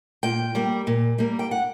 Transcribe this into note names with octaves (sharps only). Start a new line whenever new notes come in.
A#2 G5
G3 A#3
A#2
G3 A#3
G5
F#5